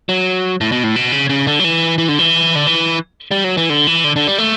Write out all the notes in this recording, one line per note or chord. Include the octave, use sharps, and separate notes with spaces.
F#3
A2
B2
A2
B2
C#3
C#3
D3
F#3
E3
E3
D3
E3
D3
E3
G3
F#3
E3
D3
E3
D3
D3
G3
A3